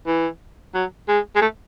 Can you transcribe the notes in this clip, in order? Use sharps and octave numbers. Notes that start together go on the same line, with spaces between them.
E3
F#3
G#3
G#3
A3